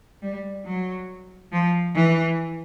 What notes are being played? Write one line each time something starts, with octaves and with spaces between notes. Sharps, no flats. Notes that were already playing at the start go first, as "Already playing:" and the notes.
G3
F#3
F3
E3